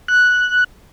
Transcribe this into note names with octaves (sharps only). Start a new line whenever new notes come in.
F#6